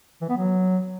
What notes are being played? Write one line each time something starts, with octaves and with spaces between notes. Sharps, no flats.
E3
B3
F#3